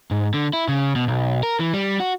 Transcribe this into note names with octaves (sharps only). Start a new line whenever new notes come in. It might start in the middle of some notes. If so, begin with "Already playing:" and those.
G#2
D3
E4
C#3
B2
B1
A#4
E3
G3
F#4